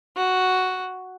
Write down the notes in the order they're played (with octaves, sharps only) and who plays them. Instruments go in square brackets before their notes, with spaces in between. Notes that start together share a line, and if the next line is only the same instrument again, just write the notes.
[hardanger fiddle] F#4